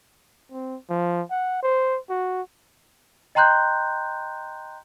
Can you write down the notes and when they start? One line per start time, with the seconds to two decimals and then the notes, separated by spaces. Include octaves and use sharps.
0.52 C4
0.90 F3
1.31 F#5
1.63 C5
2.10 F#4
3.35 D#5 G5 A#5 C6 F#6 G6